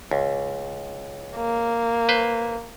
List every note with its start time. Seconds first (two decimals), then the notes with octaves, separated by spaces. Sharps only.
0.11 C#2
1.36 A#3
2.09 B4 C5